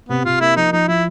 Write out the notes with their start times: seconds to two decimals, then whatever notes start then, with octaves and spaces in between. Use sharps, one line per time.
0.09 C3 B3
0.25 C3 F4
0.40 A#3 E4
0.56 F3 D#4
0.72 F3 D#4
0.88 F3 E4